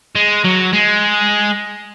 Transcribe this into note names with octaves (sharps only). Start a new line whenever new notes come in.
G#3
F#3
G#3